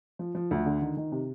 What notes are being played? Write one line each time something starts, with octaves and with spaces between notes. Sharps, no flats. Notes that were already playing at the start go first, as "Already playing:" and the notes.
F3
F3
D2
D3
D#3
D#3
C3